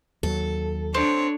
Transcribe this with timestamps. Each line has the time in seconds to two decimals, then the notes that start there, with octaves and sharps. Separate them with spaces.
0.23 D#2 F#3 A4
0.94 C4 D4 C#5